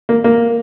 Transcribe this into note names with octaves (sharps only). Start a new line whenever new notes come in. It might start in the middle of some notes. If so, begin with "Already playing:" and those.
A#3
A#3